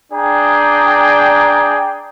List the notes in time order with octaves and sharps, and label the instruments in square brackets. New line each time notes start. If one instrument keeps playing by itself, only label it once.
[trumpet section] D4 G#4 D5 G5 A#5